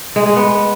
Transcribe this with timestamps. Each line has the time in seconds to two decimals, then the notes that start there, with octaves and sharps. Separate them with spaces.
0.16 G#3
0.26 G#3
0.36 B3